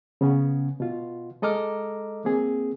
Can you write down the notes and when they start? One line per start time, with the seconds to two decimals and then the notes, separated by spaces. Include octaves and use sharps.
0.21 C#3 B3 C#4
0.80 B2 F4
1.42 G#3 A4 D#5 A#5 D6 F6
2.25 A#3 C4 G#4